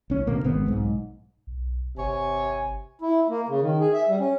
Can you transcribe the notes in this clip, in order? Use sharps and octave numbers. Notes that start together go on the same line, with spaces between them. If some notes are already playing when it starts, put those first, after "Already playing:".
C2 C#4
B2 D3 A#3
G#1 G#3 B3 C4
B1 G#2
B1
G1 C3 C#5 G#5
E4
A#3
C#3
D#3
G#4
E5
G3
C#4